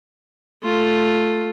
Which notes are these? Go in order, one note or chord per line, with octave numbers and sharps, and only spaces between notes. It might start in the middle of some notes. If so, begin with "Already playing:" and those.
A3 F4